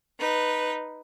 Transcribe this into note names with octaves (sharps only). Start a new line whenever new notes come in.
D#4 B4